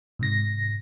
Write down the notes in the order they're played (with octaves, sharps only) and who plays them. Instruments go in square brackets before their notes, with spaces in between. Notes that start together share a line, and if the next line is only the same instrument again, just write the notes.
[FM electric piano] G#2 C3 A#6